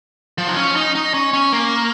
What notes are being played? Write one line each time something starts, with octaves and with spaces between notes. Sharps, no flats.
F3
D#4
C#4
D#4
D#4
C#4
C#4
A#3